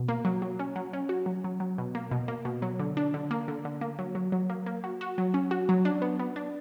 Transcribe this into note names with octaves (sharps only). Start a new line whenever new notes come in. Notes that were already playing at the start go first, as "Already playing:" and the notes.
Already playing: B2
A#3
F#3
F#3
C#4
F#3
C#4
F#4
F#3
F#3
F#3
B2
A#3
B2
A#3
B2
F#3
D3
D4
D3
A#3
D3
D3
A#3
F#3
F#3
F#3
A#3
A#3
F#4
F#4
F#3
C#4
F#4
F#3
D4
B3
B3
D4